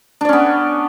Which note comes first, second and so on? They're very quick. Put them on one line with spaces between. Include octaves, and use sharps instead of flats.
D4 D5 C#4 B3